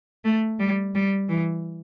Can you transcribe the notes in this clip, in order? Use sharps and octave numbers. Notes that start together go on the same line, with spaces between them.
A3
G3
G3
E3